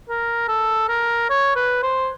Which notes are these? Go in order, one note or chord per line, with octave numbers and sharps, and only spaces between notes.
A#4
A4
A#4
C#5
B4
C5